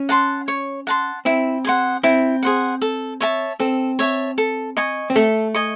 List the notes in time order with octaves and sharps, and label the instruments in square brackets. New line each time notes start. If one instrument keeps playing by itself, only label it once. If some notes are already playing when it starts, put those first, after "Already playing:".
Already playing: [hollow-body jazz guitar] C#4
[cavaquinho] F#5 A5 C6
C#5
F#5 A5 C6
[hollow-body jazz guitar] C4 [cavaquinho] E4
[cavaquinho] G#4 C5 F#5
[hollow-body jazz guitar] C4 [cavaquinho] E4
[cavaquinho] G#4 C5 F#5
A4
C#5 E5 A5
[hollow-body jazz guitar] C4 [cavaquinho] A4
[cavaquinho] C#5 E5 A5
A4
D#5 G#5 C#6
[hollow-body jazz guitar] C4
[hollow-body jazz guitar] A3 [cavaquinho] A4
[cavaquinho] D#5 G#5 C#6